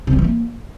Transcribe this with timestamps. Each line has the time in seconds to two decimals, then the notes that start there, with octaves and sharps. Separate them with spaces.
0.07 C3
0.13 G3
0.19 E3
0.24 A#3